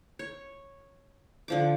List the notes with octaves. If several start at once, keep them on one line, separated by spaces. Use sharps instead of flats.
C#5
D3 F3 D6